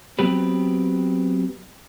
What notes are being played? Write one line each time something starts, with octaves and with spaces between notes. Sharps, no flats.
F#3 B3 C4 G4 B4